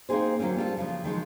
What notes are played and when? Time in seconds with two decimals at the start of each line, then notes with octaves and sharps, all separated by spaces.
0.09 A#3 C4 C#4 D#4 G#4 C5
0.39 D3 F#3 A#3 C4 C#4
0.57 G3 F4 A4
0.77 C#3 F3
1.04 D#3 F3 G#3